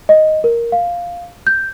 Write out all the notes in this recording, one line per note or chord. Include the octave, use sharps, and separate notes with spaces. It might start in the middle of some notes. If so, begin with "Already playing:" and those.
D#5
A#4
F5
G6